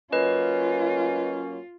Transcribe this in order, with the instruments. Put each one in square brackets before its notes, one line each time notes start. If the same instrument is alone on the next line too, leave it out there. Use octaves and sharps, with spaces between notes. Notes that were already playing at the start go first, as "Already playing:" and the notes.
[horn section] F#3 A#3 C#4 [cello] F4 [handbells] B4 D#5